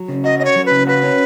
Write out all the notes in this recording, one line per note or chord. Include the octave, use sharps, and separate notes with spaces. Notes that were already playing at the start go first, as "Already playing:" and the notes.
Already playing: F#3
C#3
F#4 D#5
C#4 D#5
C#5
F#3
B4
C#3
F#4 B4
C#4